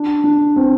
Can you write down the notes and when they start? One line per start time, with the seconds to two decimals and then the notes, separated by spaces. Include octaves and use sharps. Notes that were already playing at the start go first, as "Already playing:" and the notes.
Already playing: D4
0.24 D4
0.56 C4